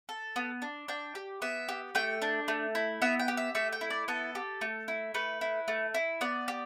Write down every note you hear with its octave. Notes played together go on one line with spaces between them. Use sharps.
A4
B3
D4
D4 G5
G4
B3 E5
G4
A3 G5
D4
A3
E4
B3 E5
G5
G4
E5
A3 E5
G5
E4
D5
B3 A4
G4
A3
E4
A3 B4
E4
A3
E4
B3 D5
G4